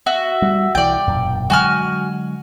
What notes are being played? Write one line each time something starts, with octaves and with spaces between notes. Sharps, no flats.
F#4 E5
G3
B1 E3 D5 G5
E1 F#2 A#2
D3 F#3 G#3 F#4 G#5 F6